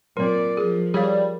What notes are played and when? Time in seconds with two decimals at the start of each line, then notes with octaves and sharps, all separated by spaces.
0.17 A#2 F#3 C4 A#4 D5
0.57 F3 G#4
0.94 G3 G#4 C#5 F5